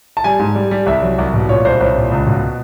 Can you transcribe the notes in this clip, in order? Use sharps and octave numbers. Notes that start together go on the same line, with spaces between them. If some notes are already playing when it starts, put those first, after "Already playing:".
A5
G3 G#5
G#2
G3
G3
C2 E5
F#3
C2
B2
A#2 C#5
C2 C5
C2 C#5
A#2
C#2
B2